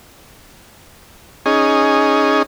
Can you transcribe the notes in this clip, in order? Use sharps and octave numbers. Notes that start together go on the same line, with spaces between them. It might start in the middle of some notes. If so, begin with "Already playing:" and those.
C#4 D#4 G#4